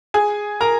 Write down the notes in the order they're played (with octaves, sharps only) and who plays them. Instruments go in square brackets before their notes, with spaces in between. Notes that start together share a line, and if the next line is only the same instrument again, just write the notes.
[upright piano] G#4 G#5
A#4 A#5